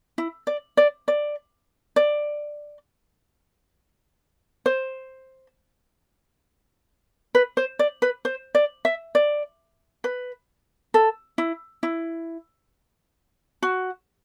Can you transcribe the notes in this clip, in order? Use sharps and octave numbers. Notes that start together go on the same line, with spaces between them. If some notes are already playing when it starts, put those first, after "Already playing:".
E4
D5
D5
D5
D5
C5
B4
C5
D5
B4
C5
D5
E5
D5
B4
A4
E4
E4
F#4